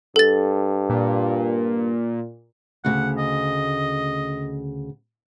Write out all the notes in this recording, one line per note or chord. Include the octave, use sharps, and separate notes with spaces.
G2 A4 A6
A#2
D2 C#3 F#5
D#5